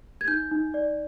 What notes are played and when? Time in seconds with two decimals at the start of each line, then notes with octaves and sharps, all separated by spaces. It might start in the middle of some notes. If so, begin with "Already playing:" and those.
0.21 G#6
0.28 D#4 G6
0.51 D#4
0.74 D5